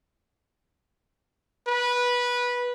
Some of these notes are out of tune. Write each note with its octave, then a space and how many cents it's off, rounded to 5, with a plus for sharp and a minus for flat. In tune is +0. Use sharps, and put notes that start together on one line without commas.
B4 -15